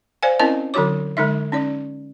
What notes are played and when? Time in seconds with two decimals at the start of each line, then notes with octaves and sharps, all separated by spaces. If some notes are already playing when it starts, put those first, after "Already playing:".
0.23 C5 D5 F5 G#5
0.39 C4 C#4 E4 A#4 D#5 A5
0.74 D3 F#3 D#4 F#4 C#5 D6
1.17 D3 G#3 D#4 E5
1.52 C#4 D#4 D5